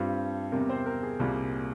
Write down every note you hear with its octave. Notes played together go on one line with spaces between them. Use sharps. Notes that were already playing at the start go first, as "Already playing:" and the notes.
Already playing: G2 G3 C4 F4
E2 C3 G3 A#4
C4 C5
A#4
G#4
C2 A#2 G3 A#3 F4